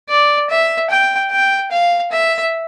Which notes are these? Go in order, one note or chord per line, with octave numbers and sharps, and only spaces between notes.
D5
E5
G5
G5
F5
E5